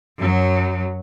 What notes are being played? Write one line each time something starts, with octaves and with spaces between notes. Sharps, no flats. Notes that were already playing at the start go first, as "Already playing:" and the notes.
F#2 F#3